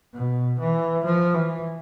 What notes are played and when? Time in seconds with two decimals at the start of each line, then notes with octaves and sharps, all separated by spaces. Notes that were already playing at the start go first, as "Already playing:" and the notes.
0.14 B2
0.59 E3
1.04 F3
1.34 E3